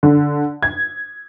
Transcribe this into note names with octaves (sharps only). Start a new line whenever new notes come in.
D3
G#6